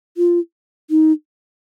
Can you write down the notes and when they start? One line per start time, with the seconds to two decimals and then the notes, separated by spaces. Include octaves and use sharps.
0.17 F4
0.90 D#4